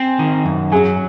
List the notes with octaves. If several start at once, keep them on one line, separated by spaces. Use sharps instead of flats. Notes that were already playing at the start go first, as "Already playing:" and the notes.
Already playing: C4 G#5
D#3
F#2
F#3 G#4 G#5